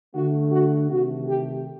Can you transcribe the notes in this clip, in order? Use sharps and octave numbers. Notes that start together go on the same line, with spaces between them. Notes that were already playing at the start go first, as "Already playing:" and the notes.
D3 A3 F#4
F#4
C3 D#3 A3 F#4
G4